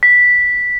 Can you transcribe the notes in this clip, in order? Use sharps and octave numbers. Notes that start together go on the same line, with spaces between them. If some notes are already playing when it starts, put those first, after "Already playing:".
B6